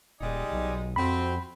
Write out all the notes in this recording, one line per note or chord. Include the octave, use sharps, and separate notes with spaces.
D#1 G3 G#3 D#4 D5 D#5 G#5
B1
F2 C4 F#4 B5